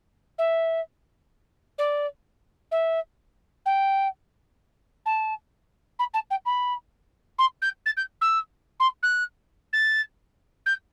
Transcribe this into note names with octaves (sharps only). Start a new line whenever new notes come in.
E5
D5
E5
G5
A5
B5
A5
G5
B5
C6
G6
A6
G6
E6
C6
F#6
A6
G6